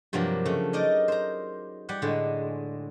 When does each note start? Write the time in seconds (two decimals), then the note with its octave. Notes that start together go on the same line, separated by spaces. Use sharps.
0.13 G2 C3 F3 F#3 A#3
0.45 C#3 A3
0.73 D#4 A#4 D5 D#5
1.08 C5 A#5
1.89 G3 G4 F#5
2.02 A2 D3 G#3